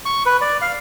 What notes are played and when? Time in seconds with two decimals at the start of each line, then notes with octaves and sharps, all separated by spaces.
0.06 C#6
0.26 B4
0.41 D5
0.61 F5